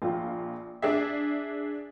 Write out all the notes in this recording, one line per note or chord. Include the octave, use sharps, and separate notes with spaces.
A#1 F4
D4 G#4 E5